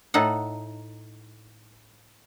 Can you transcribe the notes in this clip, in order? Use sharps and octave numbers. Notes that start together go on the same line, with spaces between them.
A2 D#4 A4 F#5